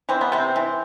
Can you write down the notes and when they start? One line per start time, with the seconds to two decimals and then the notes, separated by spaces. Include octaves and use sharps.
0.09 E3 C4
0.21 B3
0.32 C3 C4
0.56 E3